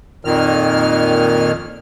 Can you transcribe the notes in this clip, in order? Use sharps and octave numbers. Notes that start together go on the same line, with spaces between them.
F2 A#2 D#3 F6